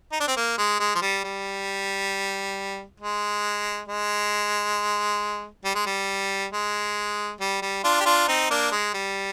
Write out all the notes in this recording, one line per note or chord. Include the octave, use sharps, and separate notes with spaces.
D#4
D4
C4
A#3
G#3
G#3
F3
G3
G3
G#3
G#3
G3
G#3
G3
G#3
G3
G3
D4 F4
G4
D4 F4
C4 D#4
A#3 D4
G#3
G3